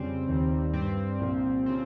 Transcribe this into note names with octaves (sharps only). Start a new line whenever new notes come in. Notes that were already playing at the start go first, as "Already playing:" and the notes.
Already playing: F2 C#3 G3 C4
D#2 D#3 G3
G2 G3 C4
C2 A#2 F3
C#3 F3 C4